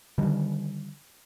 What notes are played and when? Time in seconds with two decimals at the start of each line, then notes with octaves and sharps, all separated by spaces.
0.18 D3 D#3 G3